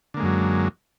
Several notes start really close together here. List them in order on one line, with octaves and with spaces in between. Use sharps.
D3 A#3 G#3 F#2 F#3